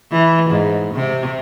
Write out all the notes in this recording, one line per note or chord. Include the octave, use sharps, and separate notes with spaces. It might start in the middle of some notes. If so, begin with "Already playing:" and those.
E3
G#2
C3